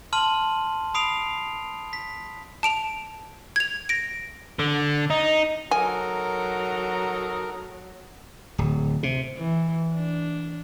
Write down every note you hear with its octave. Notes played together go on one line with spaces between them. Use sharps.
A5 C6 F6 D#7 F#7
B5 D#6 C7 D7 F7
B6
A5 D7 F7
G#6 F7
A#6 D7
D3
D#4
F#3 A4 A#4 G#5 A#5 D#6
D1
C3
E3
D4